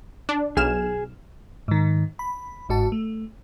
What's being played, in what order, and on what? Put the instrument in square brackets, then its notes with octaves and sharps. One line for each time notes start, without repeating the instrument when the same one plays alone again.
[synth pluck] D4
[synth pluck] B1 F6 E7 [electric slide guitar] G#4
[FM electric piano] G#2 D#3
B5
G1 G#2 F#4 A5
A3